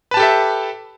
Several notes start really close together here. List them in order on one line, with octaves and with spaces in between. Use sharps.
B4 A5 G4 A4 E5